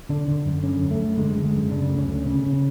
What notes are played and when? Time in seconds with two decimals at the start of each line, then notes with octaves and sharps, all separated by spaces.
0.09 D3 D4
0.28 D3
0.46 F#2
0.64 D3 C#4
0.82 F#2
0.91 A3
1.00 F#2
1.17 D3 G#3
1.36 D3
1.45 G#3
1.54 F#2
1.71 C#3 D4
1.89 D2
1.98 C#4
2.08 D2
2.26 C#3 C#4
2.43 C#3
2.53 C#4